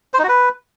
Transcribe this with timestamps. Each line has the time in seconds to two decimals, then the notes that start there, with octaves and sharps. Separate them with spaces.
0.14 C5
0.19 D#4
0.24 F#4
0.29 B4